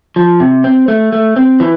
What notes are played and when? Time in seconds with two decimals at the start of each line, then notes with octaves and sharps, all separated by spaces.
0.16 F3
0.40 C3
0.64 C4
0.88 A3
1.12 A3
1.36 C4
1.60 E3